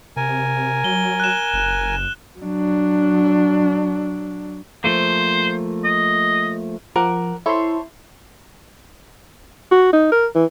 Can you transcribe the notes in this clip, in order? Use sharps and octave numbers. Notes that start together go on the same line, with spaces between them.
C3 A#4 G#5
F#3 G7
F#6 E7
F#1
F#3 D4
F3 A3 A#3 C5
D#5
F3 A#4 F#5 D6
E4 A4 C5 C#5 C6
F#4
D#4
A#4
E3